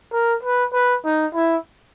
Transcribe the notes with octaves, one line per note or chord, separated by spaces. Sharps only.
A#4
B4
B4
D#4
E4